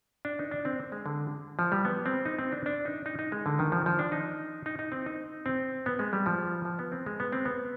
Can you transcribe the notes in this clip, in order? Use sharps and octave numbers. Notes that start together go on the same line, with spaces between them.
D4
D#4
D4
C4
G#3
D3
F3
G3
B3
C4
D#4
C4
D4
D4
D#4
D#4
D#4
G#3
D3
D#3
F3
F3
D4
D#4
D#4
D#4
C4
D#4
C4
B3
G#3
G3
F3
F3
B3
C4
G#3
B3
C4
B3